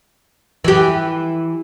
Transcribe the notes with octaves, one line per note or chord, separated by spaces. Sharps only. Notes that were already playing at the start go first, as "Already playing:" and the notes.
E3 G4